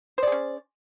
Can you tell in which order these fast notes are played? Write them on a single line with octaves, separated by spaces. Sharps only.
C5 D5 G#4 C#4